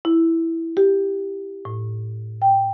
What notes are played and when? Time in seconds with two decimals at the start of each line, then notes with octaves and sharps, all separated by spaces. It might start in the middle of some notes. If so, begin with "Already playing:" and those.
0.05 E4
0.77 G4
1.65 A2
2.42 G5